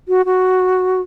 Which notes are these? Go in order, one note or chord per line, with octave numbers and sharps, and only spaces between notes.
F#4
F#4